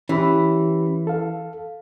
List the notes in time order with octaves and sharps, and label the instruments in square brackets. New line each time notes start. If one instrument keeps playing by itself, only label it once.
[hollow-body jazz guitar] E3 [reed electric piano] C#4 G4 B5
[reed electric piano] A4 F5